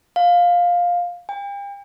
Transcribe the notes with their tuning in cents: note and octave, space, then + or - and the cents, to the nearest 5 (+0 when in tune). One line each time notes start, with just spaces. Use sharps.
F5 +10
G5 +40